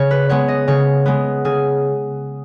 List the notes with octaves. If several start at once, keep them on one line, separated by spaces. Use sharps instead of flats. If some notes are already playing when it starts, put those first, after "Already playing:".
Already playing: C#3 C#5
B4
G#3 B3 C#5
D#5
C#3 C#5
G#3 B3
C#3 G#4